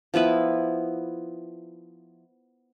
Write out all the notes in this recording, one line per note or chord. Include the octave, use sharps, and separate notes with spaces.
F3 B3 E4 B4